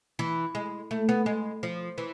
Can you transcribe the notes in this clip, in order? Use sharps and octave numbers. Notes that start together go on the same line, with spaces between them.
E3
G#3
A3
B3
G#3
F3
E3